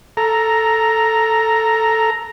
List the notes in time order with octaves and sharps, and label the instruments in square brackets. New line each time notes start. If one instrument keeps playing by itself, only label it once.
[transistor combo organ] A4 A#5